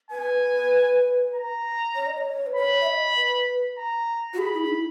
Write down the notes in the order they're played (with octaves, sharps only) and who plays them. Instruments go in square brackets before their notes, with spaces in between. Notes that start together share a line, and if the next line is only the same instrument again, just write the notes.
[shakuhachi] B4 [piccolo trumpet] G#5
[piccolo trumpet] A#5
[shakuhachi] C#5
D#5
C#5
B4
[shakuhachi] C#5 [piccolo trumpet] B5
[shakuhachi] E5
D#5
B4
[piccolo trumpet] A#5
[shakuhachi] F#4
[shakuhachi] G#4 [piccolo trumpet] B5
[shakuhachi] E4
D#4
E4